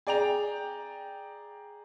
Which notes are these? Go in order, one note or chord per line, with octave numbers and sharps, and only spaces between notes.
G#4 D5 G5 A#5 F7